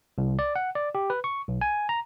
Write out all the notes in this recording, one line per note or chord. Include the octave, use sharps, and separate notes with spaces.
C2
D5
F#5
D5
G4
B4
C#6
B1
G#5
A#5